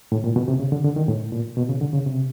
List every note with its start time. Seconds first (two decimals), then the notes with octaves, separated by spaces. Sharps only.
0.12 A2
0.24 A#2
0.36 B2
0.48 C3
0.60 C#3
0.72 D3
0.84 D3
0.96 D#3
1.08 A2
1.32 A#2
1.57 B2
1.69 C#3
1.81 D3
1.93 C#3
2.06 C3